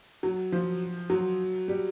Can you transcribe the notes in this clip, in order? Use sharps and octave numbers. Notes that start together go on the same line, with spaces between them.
F#3
F3
F#3
G3